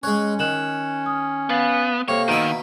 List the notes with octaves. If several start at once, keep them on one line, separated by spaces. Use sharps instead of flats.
G#3 C#4 C#5 F#6
D#3 F#6 E7 F#7
D#6 F6
B3 F5 A6 C7
C3 A#3 A4 C#5 G5
B2 D#3 E5 A#5